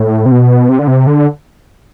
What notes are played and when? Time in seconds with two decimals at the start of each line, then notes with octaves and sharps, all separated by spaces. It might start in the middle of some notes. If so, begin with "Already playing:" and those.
Already playing: A2
0.26 C3
0.32 B2
0.69 C3
0.79 D3
0.87 C3
1.07 D3